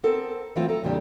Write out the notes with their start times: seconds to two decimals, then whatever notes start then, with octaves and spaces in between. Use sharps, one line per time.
0.04 B3 C4 A4 A#4
0.56 E3 F#3 A3 C4 F4
0.69 A4 A#5
0.83 E2 A#2 C#3 G3 D4